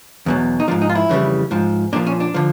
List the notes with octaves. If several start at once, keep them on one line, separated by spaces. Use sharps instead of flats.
E2 B2 F#3
D#4
G#2 F3 D4
D#4
F4
E4
F2 C#3 E3 G3
G#2 F3
A#2 F3 D4
C#4
D4
D3 F3